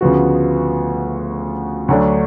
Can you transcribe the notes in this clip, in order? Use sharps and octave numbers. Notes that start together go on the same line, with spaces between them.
D2 C#3 F3 B3 F#4
D2 D3 F#3 A3 D4